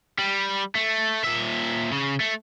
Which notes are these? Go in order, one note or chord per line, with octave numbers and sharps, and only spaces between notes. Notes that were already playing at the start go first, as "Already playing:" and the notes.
G3
A3
A#2 E5
C#3
A3